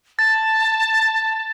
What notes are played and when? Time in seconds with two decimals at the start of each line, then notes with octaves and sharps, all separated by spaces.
0.19 A5 A6